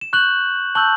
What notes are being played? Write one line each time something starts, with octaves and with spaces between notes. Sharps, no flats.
E7
C#6 F#6 G6 F#7
A5 C#6 E6 F#6 G6 F#7